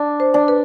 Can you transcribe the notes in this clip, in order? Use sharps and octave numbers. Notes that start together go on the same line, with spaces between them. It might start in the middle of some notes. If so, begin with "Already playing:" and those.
Already playing: D4
C5
D4
B4